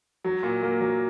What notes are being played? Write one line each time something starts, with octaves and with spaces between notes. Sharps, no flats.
F#3
A#2
A#3
F#3